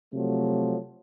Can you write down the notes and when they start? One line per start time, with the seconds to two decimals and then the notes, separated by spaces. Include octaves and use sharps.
0.14 C3 F3 F#3 A3